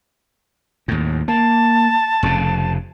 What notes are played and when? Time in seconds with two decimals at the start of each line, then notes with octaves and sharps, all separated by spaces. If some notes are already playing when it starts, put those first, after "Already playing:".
0.88 D#2 A2
1.28 A#3 A5
2.23 F1 F2 C#3